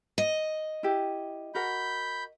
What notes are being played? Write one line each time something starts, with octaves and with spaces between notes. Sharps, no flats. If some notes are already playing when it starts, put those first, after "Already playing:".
D#5
E4 G4
F#4 A#4 F#5 B5 G6